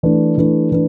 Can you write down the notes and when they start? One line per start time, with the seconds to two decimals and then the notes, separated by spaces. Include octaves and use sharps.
0.03 E3 A3 D4 B4
0.37 E3 A3 D4 B4
0.72 E3 A3 D4 B4